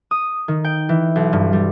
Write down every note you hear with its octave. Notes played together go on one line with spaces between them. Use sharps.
D#6
D#3
G5
E3
B1
G2
G3